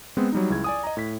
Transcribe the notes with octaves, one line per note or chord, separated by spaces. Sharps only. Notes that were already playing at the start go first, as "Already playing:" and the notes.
G#3 B3 C4
F#3 G3 D#4
C#2 E4 G#4 G#6
D5 G#5 D#6
D#5 A#5
A2 B6